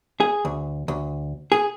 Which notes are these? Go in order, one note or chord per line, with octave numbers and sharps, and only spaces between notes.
G#4
D2
D2
G#4